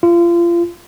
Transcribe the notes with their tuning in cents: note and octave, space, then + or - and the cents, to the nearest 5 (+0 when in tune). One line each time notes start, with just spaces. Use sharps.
F4 -30